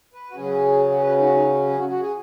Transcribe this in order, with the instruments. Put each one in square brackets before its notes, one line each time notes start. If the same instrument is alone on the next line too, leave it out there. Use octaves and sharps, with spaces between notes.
[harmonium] B4
F#4
C#3 F#3 C#4 G#4
F#4
G#4
B4
D#4
F#4
D#4
G#4
F#4
F#4
G#4